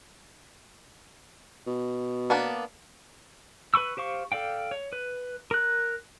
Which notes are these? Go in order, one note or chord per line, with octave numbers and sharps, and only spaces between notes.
B2
A#3 B3 D4
B4 B5 C#6 E6
G4 C5 F5 C#6
A4 D5 F5 G5
C#5
B4
A#4 F#6